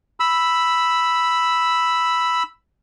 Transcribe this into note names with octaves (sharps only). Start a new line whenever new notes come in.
B5 E6